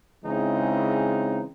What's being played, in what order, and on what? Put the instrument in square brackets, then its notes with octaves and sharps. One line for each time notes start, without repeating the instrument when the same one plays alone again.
[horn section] C#3 E3 G#3 C4 D#4